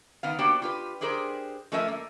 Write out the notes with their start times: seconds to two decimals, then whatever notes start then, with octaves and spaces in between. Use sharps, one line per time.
0.23 D#3 B3 F5
0.39 A#3 D4 F#4 G4 C5 G5
0.62 F4 G4 B4
1.01 D4 G4 G#4 A#4 C5
1.72 F3 A3 C#4 A#4 D#5 E5
1.88 A#3